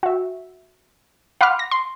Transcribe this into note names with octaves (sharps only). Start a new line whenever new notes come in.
F#4 E5
F5 F#5 B5 C6 D6 F6
A#6
C6